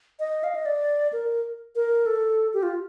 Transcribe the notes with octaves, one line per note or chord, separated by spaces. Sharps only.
D#5
F5
D#5
D5
A#4
A#4
A4
G4
F4